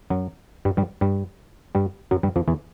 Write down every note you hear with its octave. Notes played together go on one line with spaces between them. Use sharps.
F#2 F#3
G2 G3
G2 G3
G2 G3
G2 G3
F#2 F#3
G2 G3
F2 F3
E2 E3